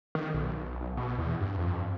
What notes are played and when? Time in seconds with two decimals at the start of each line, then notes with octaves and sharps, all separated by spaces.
0.15 D#3
0.34 B1
0.97 B2
1.18 E2
1.40 G2
1.58 F2